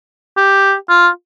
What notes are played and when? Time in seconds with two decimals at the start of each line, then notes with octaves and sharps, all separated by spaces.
0.37 G4
0.89 F4